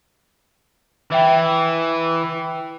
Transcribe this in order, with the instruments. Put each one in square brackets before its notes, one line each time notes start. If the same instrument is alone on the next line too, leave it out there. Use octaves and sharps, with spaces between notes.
[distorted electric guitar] E3 [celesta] E5 G5